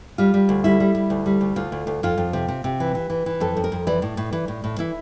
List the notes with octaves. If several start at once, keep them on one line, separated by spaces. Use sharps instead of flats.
G3 F4
G3
D2
G3 E4
G3
G3
D2
G3
D2
D2 F4
D2
D2
F2 F4
F2
C3
C3
C3
E3
E3
E3
E3
F2 A4
F2
A#4
F2
E3 D5
A2
A2
E3
A2
A2
E3 E4